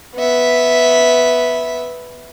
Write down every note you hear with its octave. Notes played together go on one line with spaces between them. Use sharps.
B3 E5